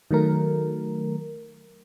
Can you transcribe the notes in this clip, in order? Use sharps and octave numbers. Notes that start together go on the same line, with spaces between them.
D#3 F#3 A3 A#4